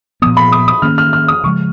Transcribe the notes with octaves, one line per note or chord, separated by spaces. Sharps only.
A#2 F3 B3 D#6
B5
D#6
D#6
D#3 A#3 C#4 F6
F6
F6
D#6
C#3 F3 G#3 C#6